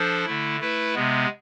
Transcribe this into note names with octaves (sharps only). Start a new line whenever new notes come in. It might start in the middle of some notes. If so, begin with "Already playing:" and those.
Already playing: F3 D4 A4 C5
D3 A3 E4
A3 E4 B4
C3 G#3 B3